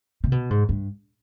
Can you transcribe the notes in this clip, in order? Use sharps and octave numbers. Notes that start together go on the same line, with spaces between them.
C3
B2
G#2
G2